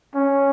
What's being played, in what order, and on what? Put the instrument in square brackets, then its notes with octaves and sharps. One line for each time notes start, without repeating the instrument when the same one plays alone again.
[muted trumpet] C#4